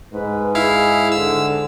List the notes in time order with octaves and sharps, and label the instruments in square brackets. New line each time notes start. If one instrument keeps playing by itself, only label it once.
[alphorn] G#2 [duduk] B4
[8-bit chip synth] E4 F5 [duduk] G#4
[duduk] D3 [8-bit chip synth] E6